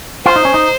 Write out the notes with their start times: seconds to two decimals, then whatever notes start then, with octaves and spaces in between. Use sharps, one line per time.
0.25 F4 C5
0.36 D#4
0.45 C#4
0.54 D#4